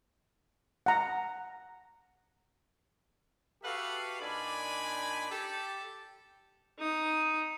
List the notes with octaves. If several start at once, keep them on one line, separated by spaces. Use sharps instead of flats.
F#5 A#5
F#4 G4 A4 B4 E5 F5
A#2 D4 D#4 D5 G#5 B5
G4 A4
D#4 D#6